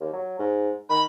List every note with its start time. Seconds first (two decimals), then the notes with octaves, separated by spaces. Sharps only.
0.01 D#2
0.13 F#3
0.39 G#2
0.89 D#3 B5